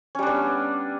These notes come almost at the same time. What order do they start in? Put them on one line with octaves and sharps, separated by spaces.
C#4 G3 D4 B3